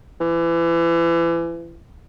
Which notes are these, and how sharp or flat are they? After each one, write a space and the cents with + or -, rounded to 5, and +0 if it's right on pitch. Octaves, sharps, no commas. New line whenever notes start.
E3 +30